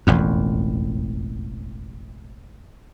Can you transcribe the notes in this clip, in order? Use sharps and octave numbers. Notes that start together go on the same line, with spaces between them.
E1 A1 F2